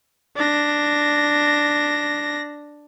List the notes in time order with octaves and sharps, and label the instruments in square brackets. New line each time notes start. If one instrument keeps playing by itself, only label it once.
[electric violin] D4 A#6